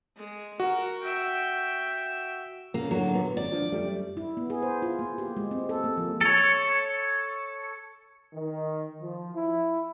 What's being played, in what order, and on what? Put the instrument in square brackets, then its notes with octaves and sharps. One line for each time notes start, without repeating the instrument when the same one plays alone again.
[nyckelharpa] G#3
[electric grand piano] F#4 [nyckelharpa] A#4
[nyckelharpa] E5 G5
[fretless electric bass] A#2 C#3 [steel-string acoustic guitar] A#3
[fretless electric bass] A2 D3 [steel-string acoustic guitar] F#3 A#3
[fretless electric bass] G1 A#2 B3
[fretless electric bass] G#1 [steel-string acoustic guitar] D5
[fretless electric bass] F3 D4
F#2 G3 A3
[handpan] E4
B3
G#4
C5
F4
A#3
G4
G#3
C4
A4
A#3
F3
[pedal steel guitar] A4 C#5
[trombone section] D#3
F3
E4